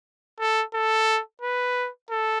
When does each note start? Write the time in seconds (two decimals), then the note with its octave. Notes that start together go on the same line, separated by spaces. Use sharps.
0.39 A4
0.73 A4
1.41 B4
2.10 A4